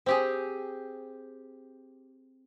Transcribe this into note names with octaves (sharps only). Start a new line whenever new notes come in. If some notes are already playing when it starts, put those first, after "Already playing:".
C4 G4 G#4